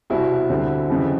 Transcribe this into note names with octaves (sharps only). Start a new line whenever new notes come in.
C2 B2 G3 C4 E4 F#4
D2 D3 G3 C4
F2 C#3 E3 G3